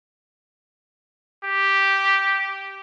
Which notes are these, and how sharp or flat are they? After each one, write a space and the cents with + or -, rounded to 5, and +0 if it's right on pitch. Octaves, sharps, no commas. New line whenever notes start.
G4 -5